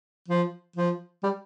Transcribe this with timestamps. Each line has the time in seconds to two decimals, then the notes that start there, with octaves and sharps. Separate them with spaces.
0.28 F3
0.76 F3
1.23 G3